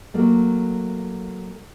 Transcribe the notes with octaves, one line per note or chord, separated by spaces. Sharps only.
F#3 A3 A#3